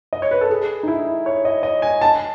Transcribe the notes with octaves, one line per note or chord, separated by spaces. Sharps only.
D#5
C#5
B4
A4
G#4
D#4
E4
C#5
D#5
D#5
G#5
A5